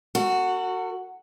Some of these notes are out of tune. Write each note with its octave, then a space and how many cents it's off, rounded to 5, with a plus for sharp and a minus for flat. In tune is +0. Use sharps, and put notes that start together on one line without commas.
F#4 +0 A#4 -45